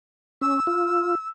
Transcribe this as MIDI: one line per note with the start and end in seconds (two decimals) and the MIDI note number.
0.41 0.60 61
0.41 1.28 88
0.67 1.15 65